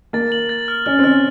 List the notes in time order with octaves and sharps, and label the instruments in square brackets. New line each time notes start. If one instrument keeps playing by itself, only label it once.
[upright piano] A#3 [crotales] A6
[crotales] F#7
A6
F6
[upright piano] C#4 [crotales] F6
[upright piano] C4
[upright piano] C#4 [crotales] F6